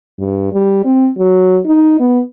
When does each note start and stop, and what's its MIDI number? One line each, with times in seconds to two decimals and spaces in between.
0.20 0.53 43
0.53 0.80 55
0.85 1.09 60
1.18 1.58 54
1.66 1.99 63
2.00 2.21 59